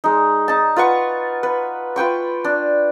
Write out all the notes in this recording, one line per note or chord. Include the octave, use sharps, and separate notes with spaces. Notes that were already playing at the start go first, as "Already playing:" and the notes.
G#3 D#4
D#4 A5
F4 B4 F#5 C#6
B4
F4 B4 G5 C#6
D4